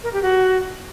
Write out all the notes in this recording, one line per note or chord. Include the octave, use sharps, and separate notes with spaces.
A#4
G4
F#4